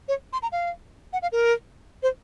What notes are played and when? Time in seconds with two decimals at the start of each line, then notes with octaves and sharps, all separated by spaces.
0.08 C#5
0.33 C6
0.42 A#5
0.52 F5
1.13 F#5
1.22 F5
1.32 A#4
2.03 C5